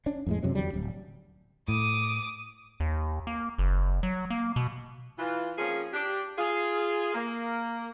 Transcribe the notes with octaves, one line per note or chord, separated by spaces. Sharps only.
C#4 D4
F2 A2 G#3
F#2 C3 F#3 C#4
E2 D3 F#3 G3
D1
A2 D6 D#6
D#2
A#3
F#1
F#3
A#3
B2
E3 F4
F3 A#3 C4 C#4 F4 G#4
D4 G4
F4 G#4
A#3